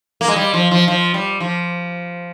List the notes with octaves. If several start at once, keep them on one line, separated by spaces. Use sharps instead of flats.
A#3
G#3
G3
F3
F3
F3
G3
F3